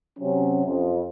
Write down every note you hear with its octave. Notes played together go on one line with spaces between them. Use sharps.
C3 F#3 C#4
F2